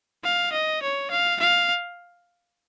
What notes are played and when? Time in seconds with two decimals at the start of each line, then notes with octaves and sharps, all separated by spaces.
0.24 F5
0.53 D#5
0.82 C#5
1.11 F5
1.40 F5